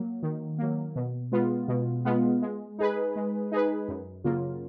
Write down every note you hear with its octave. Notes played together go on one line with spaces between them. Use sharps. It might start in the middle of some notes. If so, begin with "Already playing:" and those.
Already playing: F#3 A#3
D#3
F#3 A#3
B2
G#3 B3 F4
B2
G#3 B3 F4
G#3
D#4 G#4 B4
G#3
D#4 G#4 B4
F#2
C#3 F#3 A#3 F4